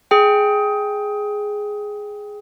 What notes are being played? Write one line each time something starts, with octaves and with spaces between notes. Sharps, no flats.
G#4 G5